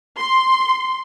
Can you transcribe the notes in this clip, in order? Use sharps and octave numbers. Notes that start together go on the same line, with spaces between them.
C6